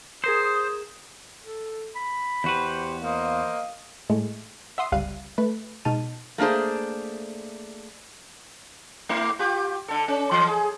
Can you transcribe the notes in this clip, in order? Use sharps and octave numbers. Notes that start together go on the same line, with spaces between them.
G#4 A#4 C5 D#6 E7
A4
B5
E2 F#4 G4 B4 C5
A#3 C5 D#5 F5
A2 G#3 A3
E5 F#5 C6 D#6 C7
G1 C#2 G3 F5 F#6 D#7
A3 B4
B2 G#3 D#4 A5 F6 D#7
A3 A#3 D4 G#4 C5
A3 E4
F4 G4
D3 A4
C#4
E3
G#4